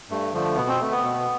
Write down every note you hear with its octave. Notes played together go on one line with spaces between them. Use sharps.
G2 A3
D3 F3 A3
B2 B3
C4
A3
B3
B2